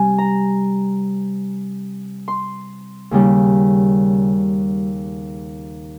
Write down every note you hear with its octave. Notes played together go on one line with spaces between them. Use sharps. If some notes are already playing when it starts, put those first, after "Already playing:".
Already playing: C3 G3 C4 G#5
A#5
C6
D#2 C#3 G3